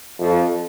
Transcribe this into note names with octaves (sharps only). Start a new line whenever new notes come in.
F2